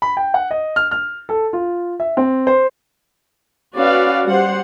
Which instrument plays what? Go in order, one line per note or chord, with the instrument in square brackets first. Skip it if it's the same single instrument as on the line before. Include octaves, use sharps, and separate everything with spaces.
[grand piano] B5
G5
F#5
D#5
F6
F6
A4
F4
E5
C4
C5
[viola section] C#4 F#4 B4 D5 F5
G3 G4 C5 F#5